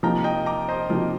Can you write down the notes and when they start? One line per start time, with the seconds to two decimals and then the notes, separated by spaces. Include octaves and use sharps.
0.03 C3 F3 A#3 D#4 G5 A#5
0.24 D#5 G5
0.46 A#5 D6
0.68 C5 D#5
0.89 C3 F3 A#3 D#4